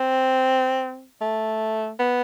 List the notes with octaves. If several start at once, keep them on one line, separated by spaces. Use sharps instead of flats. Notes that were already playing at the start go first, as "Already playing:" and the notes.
Already playing: C4
A3
B3